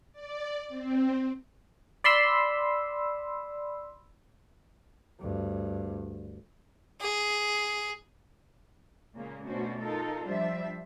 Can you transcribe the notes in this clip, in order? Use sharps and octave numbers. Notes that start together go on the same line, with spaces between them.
D5
C4
D5 B5 C6 E6
D2 G2
G#4
A#2 C#3 G#3 A#3 C#4
B2 A3 C#4 D4 F#4 C5
D#4 F4 A4 A#4
F3 G3 D4 C5 E5